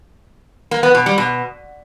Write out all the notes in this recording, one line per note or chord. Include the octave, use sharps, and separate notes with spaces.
A#3
B3
B2
G3
B2